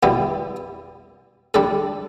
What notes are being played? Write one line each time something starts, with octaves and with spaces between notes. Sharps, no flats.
B2 G3 B3 E4
G3 D4 A4